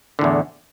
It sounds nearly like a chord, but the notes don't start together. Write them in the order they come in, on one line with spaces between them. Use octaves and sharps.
D3 A2 E2